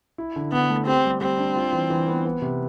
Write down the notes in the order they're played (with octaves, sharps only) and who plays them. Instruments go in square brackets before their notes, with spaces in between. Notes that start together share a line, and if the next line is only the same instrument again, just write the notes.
[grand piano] E4
D3
[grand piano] D3 [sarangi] B3
[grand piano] A3
[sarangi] C4 [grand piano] G4
[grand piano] G3
[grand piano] G3 [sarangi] C4
[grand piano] D4
F4
E3
E3
B3
B3
C3